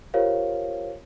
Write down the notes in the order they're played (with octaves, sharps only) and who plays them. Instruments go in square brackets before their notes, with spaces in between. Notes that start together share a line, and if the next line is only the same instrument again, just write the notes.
[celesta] F4 G4 A#4 C5 C#5 F5